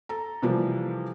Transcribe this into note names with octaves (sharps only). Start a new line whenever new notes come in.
A4 A#5
C3 E3 F3 G3 A3 A#3